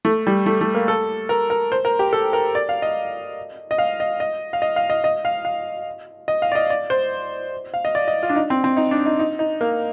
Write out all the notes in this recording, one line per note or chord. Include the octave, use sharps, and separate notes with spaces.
A3
G3
A3
A3
A#3
A4
A#4
A#4
C5
A#4
G4
A4
A#4
D5
F5
D#5
D#5
F5
D#5
D#5
F5
D#5
F5
D#5
D#5
F5
F5
D#5
F5
D5
D#5
D5
C5
F5
D#5
D5
D#5
F4
D4
D#4
C4
C4
D#4
D4
D#4
D#4
D#4
A#3